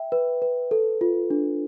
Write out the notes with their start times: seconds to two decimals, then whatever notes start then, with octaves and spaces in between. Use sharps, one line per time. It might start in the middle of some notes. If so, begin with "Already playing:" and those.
Already playing: E5 G5
0.12 B4
0.42 B4
0.71 A4
1.01 F4
1.30 D4